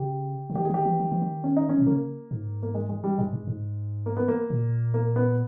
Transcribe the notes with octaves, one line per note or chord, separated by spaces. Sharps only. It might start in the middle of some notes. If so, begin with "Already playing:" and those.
Already playing: C#3 G4
C#3
D#3 G4
G#4
D#3 G4
E3
D#3
E3
D#3
C#4
D#4
C#4
B2
C#3 A#3
G#2
A#3
G#3
G#3
G3
G2 G#3
G2
G#2
A#3
B3
A#3
A#2
A#3
B3